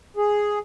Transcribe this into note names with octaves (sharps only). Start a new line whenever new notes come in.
G#4